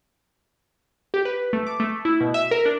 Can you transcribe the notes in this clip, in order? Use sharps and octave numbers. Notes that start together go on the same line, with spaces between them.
G4
B4
A3
D6
A3
E4
B2
E5
A#4
D4